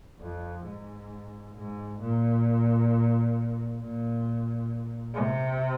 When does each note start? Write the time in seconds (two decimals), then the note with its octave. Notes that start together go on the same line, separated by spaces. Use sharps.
0.19 F2
0.65 G#2
1.55 G#2
2.00 A#2
3.80 A#2
5.14 C3